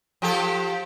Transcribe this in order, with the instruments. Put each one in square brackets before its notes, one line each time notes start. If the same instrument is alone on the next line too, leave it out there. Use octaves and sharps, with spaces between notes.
[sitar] F3 G4 A4